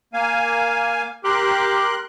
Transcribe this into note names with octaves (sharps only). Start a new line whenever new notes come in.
A#3 F5 G#5
G4 A#4 C6 F#6